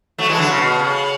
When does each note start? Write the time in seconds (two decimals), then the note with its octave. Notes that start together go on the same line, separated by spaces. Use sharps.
0.18 F#3 A3
0.29 E3 G#3
0.38 D3 F#3
0.49 C#3
0.58 B2
0.79 C#3